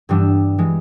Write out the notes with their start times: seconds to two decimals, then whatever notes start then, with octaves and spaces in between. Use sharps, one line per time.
0.09 G2 E3 G3 B3 D4 E6
0.58 E3 G#3